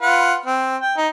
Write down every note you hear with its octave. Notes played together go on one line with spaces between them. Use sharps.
F4 B4 F#5
C4
G5
D#4